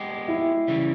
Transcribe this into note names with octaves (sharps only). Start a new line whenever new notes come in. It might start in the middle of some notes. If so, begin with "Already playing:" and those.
Already playing: G#3 B3 G4
E4
C#3 E3 G3